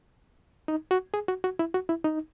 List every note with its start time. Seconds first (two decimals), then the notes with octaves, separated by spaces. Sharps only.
0.68 D#4
0.91 F#4
1.14 G#4
1.28 F#4
1.44 F#4
1.59 E4
1.74 F#4
1.89 E4
2.05 D#4